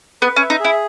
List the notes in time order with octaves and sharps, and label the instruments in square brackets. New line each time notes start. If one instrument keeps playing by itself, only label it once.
[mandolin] B3 [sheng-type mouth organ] B4
[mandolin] C#4
[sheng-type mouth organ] E5
[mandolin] D#4
[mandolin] E4 [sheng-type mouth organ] G#4